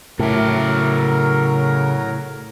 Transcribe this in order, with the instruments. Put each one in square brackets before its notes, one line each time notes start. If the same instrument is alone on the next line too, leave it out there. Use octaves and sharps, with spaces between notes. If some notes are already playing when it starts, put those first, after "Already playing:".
[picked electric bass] A2 [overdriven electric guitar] C#3 E5 [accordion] F#3 A#4